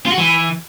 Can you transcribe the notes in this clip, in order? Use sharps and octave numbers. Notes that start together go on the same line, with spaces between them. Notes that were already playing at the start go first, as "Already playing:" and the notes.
F4
F#4
E3